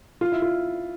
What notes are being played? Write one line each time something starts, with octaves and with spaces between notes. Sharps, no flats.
F4
E4
F4